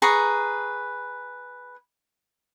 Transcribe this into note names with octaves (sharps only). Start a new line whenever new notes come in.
G#4 B4 A#5 C#6